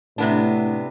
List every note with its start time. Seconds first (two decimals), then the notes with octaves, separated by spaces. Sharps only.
0.18 A2 C3 B3 D4